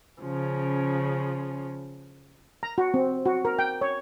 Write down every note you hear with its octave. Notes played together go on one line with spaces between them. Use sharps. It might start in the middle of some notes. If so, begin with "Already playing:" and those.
C#3 F3 C#4
A#5
F#4
C4
F#4
A#4
G5
C#5